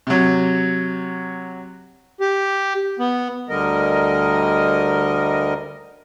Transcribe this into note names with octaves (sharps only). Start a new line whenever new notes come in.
C3 F#3
G4
B3
D2 D3 G3 A#4 D#5